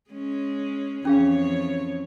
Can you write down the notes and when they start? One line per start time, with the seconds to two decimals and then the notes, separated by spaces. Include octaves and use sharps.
0.11 G#3 C#4
1.05 F2 E3 C#4 G#4 C#5 F5